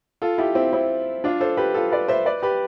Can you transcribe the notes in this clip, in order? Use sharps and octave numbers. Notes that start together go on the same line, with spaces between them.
F4 A4
E4 G4
C4 E4
C4 E4
D4 F4
A4 C5
G4 B4
F4 A4
B4 D5
C5 E5
B4 D5
G4 B4